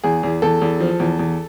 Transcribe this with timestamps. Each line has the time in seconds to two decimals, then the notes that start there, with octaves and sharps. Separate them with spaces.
0.04 E2 G#4
0.23 E2
0.42 E2 A4
0.62 E2
0.80 F3
1.00 E2
1.19 E2